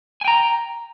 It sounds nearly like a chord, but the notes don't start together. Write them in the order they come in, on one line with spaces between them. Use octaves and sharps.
G#5 G5 A#5